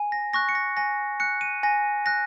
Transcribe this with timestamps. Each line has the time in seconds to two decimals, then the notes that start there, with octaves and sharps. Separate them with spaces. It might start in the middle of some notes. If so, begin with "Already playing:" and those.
Already playing: G#5
0.12 A#6
0.33 C#6 F#6 A#6
0.49 C#7
0.55 A#6
0.77 G#5 A#6
1.20 F#6 C#7
1.41 D#7
1.63 G#5 A#6
2.06 F#6 A#6